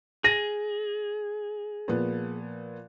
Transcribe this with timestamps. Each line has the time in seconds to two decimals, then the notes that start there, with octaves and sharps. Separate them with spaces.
0.24 G#4 A#6 D#7
1.88 A#2 F3 B3